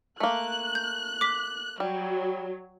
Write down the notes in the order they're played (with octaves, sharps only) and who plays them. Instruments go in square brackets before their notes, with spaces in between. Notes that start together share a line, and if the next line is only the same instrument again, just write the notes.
[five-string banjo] A3 A#3 [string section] F#6
[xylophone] G6
D6 B6
[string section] F#3 [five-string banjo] G3